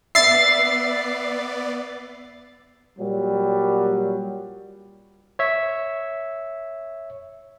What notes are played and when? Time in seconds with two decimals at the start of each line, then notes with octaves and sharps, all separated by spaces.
0.15 B3 D5 E5 A6 C7
2.99 A#2 F#3 G3
5.39 C#5 E5